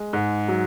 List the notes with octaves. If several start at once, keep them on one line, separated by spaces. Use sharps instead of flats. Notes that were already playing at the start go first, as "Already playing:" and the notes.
Already playing: G#3
G#2
F#3